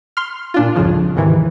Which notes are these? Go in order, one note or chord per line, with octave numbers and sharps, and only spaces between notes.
C6 F6
A#2 D4 F4
C2 F2 G#2 C#3 F3
D#2 G#2 C3 D#3 E3